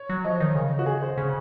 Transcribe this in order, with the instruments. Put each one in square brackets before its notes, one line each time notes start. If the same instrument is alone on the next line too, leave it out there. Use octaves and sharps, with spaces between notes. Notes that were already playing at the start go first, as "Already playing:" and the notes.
Already playing: [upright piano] C#5
[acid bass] F#3
[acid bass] F3 [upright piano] D#5
[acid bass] D#3
C#3
[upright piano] F#4
G#4
C5
[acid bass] C#3